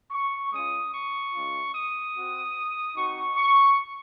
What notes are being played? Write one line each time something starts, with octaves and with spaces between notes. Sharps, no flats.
C#6
G#3 C#4 F4 D#6
C#6
G#3 C#4 F4
D#6
C4 F#4
C4 D#4 F#4 C#6
C#6